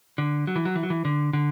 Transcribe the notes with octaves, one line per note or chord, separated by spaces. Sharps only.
D3
F#3
E3
F#3
E3
F#3
E3
D3
D3